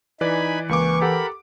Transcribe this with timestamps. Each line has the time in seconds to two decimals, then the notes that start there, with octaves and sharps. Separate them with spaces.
0.21 E3 D#4 B4 D5 G#5 B5
0.69 C#2 E3 A#3 C#6 D6
1.01 G4 A4 A#4 F#5 B5